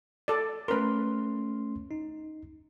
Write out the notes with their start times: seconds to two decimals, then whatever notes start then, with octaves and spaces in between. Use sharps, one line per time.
0.28 A4 D5
0.68 A3 C#4 A#4 B4 C6
1.91 D#4